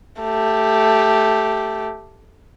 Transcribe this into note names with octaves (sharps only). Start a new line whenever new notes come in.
A3 G4